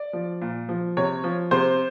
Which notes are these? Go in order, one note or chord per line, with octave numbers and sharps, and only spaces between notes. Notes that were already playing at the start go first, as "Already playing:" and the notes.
Already playing: D5
F3
A#2
F3
C3 C#5
F3
C3 C5